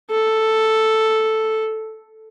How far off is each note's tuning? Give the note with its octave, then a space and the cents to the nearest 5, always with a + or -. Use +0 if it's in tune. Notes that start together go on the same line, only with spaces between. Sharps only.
A4 +0